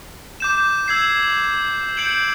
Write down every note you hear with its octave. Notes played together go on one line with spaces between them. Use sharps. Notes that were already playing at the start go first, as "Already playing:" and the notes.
D6 G6 E7
E6 G#6 C7
G6 C#7 D7 F#7